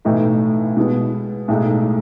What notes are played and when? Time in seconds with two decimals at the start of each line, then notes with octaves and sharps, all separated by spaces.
0.05 B1 A2 E3 A3 D#4
0.77 B2 G#3 B3
1.48 B1 A2 G#3 D#4 A4